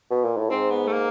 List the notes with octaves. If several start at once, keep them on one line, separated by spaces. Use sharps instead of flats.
B2
A#2
A2
G#2 C4
B3
A3
A#3